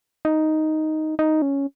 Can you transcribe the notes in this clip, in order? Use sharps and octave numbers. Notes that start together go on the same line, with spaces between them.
D#4
D#4
C#4